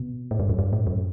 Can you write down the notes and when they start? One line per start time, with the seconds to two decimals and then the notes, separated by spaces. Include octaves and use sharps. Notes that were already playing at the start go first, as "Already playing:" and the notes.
Already playing: B2
0.31 A2
0.40 G2
0.49 F#2
0.59 G2
0.73 A2
0.87 F#2